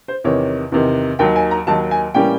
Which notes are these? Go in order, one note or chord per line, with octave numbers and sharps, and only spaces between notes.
C5
E2 C3 D#3 C#5
E2 C3 D#3
D#2 D#3 F#3 G5
G#5
A#5
D#2 D#3 F#3 A5
G#5
A2 E3 G3 A#3 C#4 G5